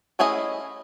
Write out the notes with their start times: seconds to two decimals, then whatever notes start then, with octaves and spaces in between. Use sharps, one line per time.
0.19 A3 C#4 E4 G#4 D#5